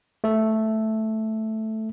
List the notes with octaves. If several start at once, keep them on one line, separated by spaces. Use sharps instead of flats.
A3 A4